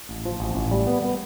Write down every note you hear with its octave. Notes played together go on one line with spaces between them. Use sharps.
A1
F3
A1
A1
G3
B3
B3